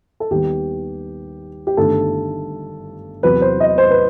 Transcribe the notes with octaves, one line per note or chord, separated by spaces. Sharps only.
A4
D#2 D#3 G3 B3 G4
G4
G1 G2 D#3 A3 A4
E2 C3 F#3 B3 B4
C5
D#5
C5
B4